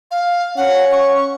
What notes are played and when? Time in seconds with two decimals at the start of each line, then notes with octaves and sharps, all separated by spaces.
0.11 F5
0.57 C#4 F#5
0.92 C#6